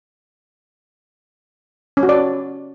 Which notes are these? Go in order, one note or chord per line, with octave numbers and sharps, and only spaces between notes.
C#4
F#4
D5